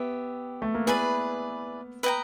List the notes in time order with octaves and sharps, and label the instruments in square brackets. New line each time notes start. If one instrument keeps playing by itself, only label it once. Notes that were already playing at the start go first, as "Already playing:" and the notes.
Already playing: [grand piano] B3 [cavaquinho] G4 E5
[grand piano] A3
A#3
[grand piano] B3 [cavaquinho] E4 G#4 B4 D5
[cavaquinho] B4 D#5 G5 A#5